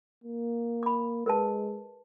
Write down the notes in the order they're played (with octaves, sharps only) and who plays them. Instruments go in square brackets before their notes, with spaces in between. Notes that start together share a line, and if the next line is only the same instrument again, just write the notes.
[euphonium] A#3
[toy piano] B5 D6
[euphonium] G#3 [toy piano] A#4 B4 A5